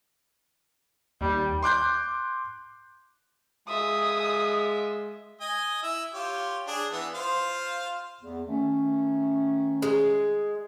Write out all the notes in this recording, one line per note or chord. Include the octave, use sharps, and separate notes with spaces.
D#2 G3
C6 D6 F#6 G6
G#3 F4 E5 D#6
D#5 G#5
E4 E5
F4 G4 C#5
D4 G#4
E3 B3
F4 C5 F5
E2
D#3 A3 C#4
G#3